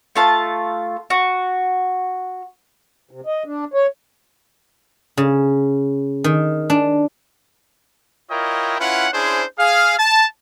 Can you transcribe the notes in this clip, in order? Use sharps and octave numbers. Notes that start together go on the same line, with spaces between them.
A3 F4 A5
F#4
C3
D#5
D4
C#5
C#3
D#3
D4
E4 F4 A#4 C#5 D#5 G5
C#4 E4 F4 B4 F#5
C#4 D4 E4 G#4 C5
G#4 F5
A5